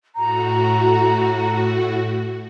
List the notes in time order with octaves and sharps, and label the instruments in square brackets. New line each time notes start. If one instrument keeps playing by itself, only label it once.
[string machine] A2 F#4 [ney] A#5